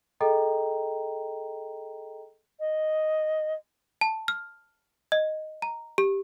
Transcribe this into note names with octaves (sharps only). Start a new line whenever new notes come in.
G#4 A4 D#5 G5 A#5
D#5
A5
F6
D#5
A#5
G4